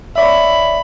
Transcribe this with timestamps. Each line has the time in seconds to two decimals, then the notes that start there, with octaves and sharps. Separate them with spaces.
0.16 C#5 D5 E5 B5